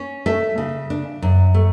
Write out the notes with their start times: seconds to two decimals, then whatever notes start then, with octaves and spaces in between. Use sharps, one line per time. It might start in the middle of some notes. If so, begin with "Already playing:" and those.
Already playing: C#4
0.26 A3 E5
0.58 C#3
0.90 D4
1.22 F#2
1.54 A3